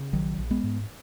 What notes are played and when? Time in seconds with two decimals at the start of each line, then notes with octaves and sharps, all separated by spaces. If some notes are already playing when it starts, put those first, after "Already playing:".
Already playing: C#3
0.13 A#1 D#3 F#3
0.38 A#1
0.51 G#3 B3
0.64 G#2